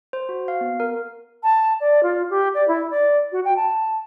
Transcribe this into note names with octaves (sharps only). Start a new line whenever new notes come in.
C5
F#4
F5
B3
A#4
A5
D5
F4
G4
D5
E4
D5
F#4
G5
A5